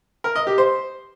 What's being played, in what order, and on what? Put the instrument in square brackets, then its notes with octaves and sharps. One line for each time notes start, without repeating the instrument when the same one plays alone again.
[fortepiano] A#4
D#5
G4
C5